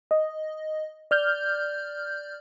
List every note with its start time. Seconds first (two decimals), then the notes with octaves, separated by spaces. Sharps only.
0.11 D#5
1.11 D5 F6 G6